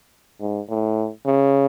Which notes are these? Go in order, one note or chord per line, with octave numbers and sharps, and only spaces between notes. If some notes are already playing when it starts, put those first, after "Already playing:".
G#2
A2
C#3